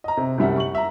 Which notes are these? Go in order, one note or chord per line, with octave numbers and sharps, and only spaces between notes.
D#5 A#5
C3
C2 F#2 G3 E5 F#5
C#6 F#7
E5 A#5